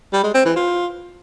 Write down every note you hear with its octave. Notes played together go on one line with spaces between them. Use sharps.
G3
G#3
C4
E3
F4